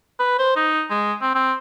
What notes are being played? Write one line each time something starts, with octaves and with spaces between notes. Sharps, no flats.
B4
C5
D#4
G#3
C4
C4